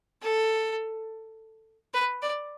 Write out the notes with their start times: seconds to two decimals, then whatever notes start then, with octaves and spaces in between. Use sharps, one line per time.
0.22 A4
1.94 B4
2.22 D5